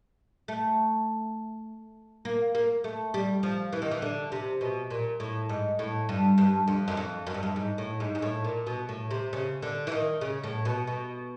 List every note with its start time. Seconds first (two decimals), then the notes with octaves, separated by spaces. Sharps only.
0.48 A3
2.25 A#3
2.55 A#3
2.84 A3
3.14 G3
3.43 F3
3.73 E3
3.82 D#3
3.91 E3
4.02 D3
4.32 C3
4.61 B2
4.90 A#2
5.20 A2
5.49 G#2
5.79 A2
6.09 G2
6.38 G2
6.68 F2
6.88 F#2
6.97 F2
7.27 F#2
7.34 G2
7.43 F#2
7.56 G#2
7.78 A2
8.00 G#2
8.15 G#2
8.22 A2
8.45 A#2
8.67 B2
8.89 A2
9.11 C3
9.33 C#3
9.62 D3
9.87 E3
9.92 D#3
10.21 C#3
10.44 A2
10.65 B2
10.87 B2